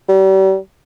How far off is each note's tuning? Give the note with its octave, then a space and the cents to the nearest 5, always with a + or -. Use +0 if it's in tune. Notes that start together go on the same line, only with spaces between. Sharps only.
G3 -40